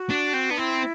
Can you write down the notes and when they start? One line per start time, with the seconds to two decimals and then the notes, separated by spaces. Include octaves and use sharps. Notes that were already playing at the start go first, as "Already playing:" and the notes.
Already playing: F#4
0.10 D4
0.34 C4
0.50 B3 D4
0.58 C4 E4